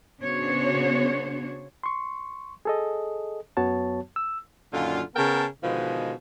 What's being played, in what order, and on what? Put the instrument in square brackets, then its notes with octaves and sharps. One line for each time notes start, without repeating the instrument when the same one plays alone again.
[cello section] C#3 B3 D4 F#4 C5 C#5
[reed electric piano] C6 C#6
G#4 A4 D#5
F#2 F#3 B3 F#4 C#5 A5
E6
[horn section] F#2 A#2 D3 D#3 F4
C#3 B3 A#4 G5 A5
B2 D3 D#3 F3 G#3 B3